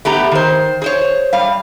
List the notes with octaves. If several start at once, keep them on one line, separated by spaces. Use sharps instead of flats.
A3 B3 G4 A#5
D#3 C5
G#4 C5 C#5
G3 F5